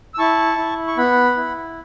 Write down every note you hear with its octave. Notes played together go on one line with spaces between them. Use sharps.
E6
E4 A5 C#6
E4
C#6
B3 F#5 B5
E4